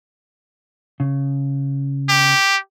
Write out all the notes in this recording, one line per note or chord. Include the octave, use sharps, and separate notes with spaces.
C#3
G4